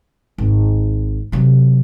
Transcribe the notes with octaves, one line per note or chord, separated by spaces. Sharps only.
G#1
C3 F#3